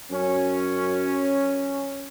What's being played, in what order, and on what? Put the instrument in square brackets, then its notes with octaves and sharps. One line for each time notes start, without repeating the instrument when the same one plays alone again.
[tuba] F#2 [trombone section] C#4